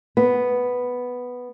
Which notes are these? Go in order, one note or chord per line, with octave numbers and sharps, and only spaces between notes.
B3